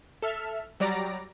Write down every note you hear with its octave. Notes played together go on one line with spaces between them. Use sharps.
A4 E5 F6
F#3 G3 D5 A#5 D6 A#6